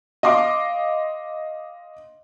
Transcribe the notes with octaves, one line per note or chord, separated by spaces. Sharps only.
D#5 F5 C6 D6